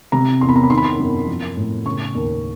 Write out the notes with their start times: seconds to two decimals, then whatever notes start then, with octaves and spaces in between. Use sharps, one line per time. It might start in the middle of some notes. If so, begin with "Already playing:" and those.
0.12 C3 A#5
0.41 E2 C6
0.49 B5
0.56 A#5
0.63 B5
0.70 D#3 C6
0.77 B5
0.84 C6
0.99 F#2
1.27 F3
1.57 A2
1.85 C#3 C#6
2.15 D#2